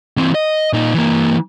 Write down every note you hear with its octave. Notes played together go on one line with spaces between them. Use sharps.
E3 C4
D#5
A#2 D#4
E3 A#3